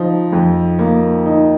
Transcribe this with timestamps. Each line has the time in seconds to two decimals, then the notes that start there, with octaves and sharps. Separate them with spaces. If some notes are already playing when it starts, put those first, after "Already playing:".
Already playing: F3 D#4
0.33 F2
0.79 A#3
1.25 D#4